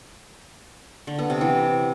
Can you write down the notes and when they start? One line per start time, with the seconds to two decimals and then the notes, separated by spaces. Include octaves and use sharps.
1.07 D3
1.19 B3
1.30 C3
1.41 E3